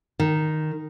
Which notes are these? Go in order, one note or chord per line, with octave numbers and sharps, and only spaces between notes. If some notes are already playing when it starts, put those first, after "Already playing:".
D#3